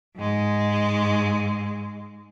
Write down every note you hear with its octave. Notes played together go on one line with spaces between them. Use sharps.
G#2 G#3